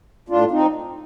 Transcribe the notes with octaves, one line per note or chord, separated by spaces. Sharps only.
A2 D4 F4
C4 D#4